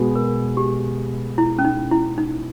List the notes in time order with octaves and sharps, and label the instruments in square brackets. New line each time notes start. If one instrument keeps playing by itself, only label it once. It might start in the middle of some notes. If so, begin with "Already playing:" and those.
Already playing: [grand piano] B2 G#3 B3
[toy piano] A#4
G4
E4
C#4
D#4
E4
D#4